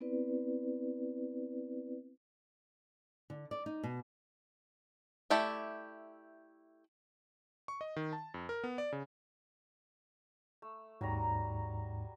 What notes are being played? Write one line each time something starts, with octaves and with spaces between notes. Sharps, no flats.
B3 C4 E4 B4 D5
D3
D5
D#4
B2
A3 E4 G4 D5
C#6
D#5
D#3
A5
F2
A#4
B3
D5
C#3
A3
D#2 G#2 F#3 G3 A#5